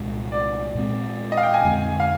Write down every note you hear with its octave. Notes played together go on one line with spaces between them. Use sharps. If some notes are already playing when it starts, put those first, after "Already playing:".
Already playing: C2 A#2 G#3
D5
A#2 G#3 C4
D#5
F5
G5
G#5
F2 D3 G#3 C4
F5